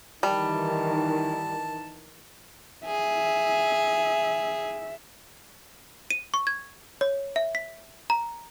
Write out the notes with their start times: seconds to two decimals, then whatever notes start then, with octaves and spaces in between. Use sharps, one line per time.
0.23 D#3 E3 G3 A5
2.86 G#4 E5
6.10 D#7
6.34 C#6
6.47 G#6
7.01 C#5
7.36 E5
7.55 B6
8.10 A#5